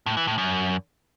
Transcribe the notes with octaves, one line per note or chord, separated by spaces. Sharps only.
A2
E3
A2
F#2